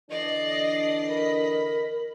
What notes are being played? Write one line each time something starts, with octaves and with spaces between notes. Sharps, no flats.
D3 E3 D4 D5 D#5 C7
A#4 B5